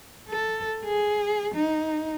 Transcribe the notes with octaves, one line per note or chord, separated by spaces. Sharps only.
A4
G#4
D#4